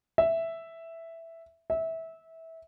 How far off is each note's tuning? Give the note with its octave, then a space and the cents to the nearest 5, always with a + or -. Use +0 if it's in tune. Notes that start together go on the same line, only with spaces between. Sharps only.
E5 +0
E5 -20